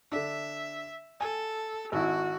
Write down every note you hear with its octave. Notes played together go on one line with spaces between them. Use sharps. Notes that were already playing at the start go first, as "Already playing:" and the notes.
D3 D4 E5
A4 G#5
G#1 E4 F#4